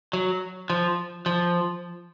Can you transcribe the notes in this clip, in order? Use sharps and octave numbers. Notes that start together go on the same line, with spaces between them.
F#3
F3
F3